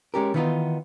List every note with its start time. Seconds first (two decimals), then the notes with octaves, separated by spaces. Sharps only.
0.14 G#3 C#4 G4 A#4
0.34 D#3 E3 B3 C#4 D#4 F4